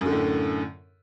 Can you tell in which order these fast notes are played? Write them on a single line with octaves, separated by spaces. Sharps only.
F#2 D3 A2